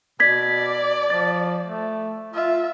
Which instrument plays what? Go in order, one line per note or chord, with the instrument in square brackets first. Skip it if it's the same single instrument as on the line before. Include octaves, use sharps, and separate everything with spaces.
[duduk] B2 [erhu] D5 [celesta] G#6 B6
[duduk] F3 [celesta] A6
[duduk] A3
[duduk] F4 [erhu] E5